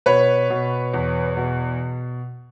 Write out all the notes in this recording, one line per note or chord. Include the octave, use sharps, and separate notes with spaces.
B2 B4 C#5
B2
E2
B2